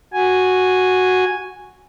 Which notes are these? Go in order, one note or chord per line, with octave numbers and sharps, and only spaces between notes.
F#4 G#5